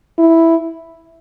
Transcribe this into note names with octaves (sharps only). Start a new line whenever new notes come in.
E4